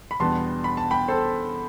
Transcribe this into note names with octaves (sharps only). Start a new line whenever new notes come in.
B5
E2 B2 G3 B3 D4 A5 C6
B5
A5
G5 B5
A4 C5